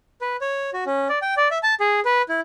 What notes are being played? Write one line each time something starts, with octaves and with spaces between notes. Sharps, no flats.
B4
C#5
F#4
C#4
D5
G5
D5
E5
A5
G#4
B4
E4